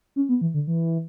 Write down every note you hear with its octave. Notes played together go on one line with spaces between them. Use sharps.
C#4
B3
E3
D3
E3